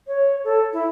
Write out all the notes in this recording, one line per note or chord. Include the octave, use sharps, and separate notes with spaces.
C#5
A4
E4